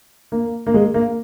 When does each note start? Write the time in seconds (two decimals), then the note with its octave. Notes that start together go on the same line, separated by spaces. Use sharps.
0.32 A#3
0.67 A#3
0.74 G#3
0.94 A#3